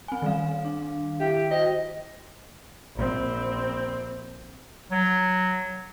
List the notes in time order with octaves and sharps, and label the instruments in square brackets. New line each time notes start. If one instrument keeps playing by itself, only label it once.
[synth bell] C4 G#5
D#3 G3 F5
[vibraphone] D4
[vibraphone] E4 E5 [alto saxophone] G4
[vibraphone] F#4 C5 G5 [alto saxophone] D#5
[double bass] A#1 C4
[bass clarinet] F#3